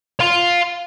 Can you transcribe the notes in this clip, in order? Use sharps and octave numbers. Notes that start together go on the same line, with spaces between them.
F5 C6